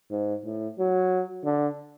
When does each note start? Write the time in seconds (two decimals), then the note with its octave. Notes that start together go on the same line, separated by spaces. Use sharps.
0.11 G#2
0.45 A2
0.78 F#3
1.44 D3